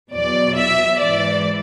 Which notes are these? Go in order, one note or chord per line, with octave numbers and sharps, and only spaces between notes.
E2 B2 F#3 D5
E5
G#2 E3 D5